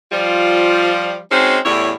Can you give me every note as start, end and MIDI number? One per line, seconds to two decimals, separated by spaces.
0.12 1.17 53
0.12 1.17 55
0.12 1.17 65
1.30 1.58 56
1.30 1.58 60
1.30 1.58 61
1.30 1.58 63
1.30 1.58 66
1.30 1.58 72
1.64 1.91 40
1.64 1.91 45
1.64 1.91 55
1.64 1.91 64
1.64 1.91 73